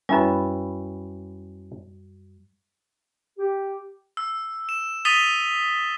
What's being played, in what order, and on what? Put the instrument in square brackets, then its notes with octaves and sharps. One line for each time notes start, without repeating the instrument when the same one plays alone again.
[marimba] F#2 G3 [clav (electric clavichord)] C#4 E4 B4
[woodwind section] G4
[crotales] E6
E7
D#6 A6 B6 D#7 F7 G7